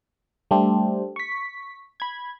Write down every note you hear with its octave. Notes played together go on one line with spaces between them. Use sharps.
G3 A3 D4 G4 A4 C5
C#6 B6
B5 G#6